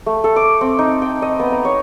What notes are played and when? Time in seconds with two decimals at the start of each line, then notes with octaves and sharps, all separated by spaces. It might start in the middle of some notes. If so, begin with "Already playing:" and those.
0.06 A3
0.24 A4
0.36 D6
0.61 C4
0.79 D#4
1.02 G5
1.22 D#5
1.40 B3
1.52 A#5
1.65 C#5